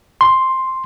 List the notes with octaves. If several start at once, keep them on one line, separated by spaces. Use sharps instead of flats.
C6